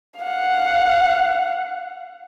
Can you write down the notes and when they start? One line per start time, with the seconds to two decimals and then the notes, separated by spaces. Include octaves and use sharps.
0.20 F5 F#5